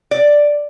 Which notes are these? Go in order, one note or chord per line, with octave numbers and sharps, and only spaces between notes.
D5